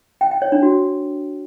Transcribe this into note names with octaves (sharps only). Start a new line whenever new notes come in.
G5
G5
C#5
D4
F#4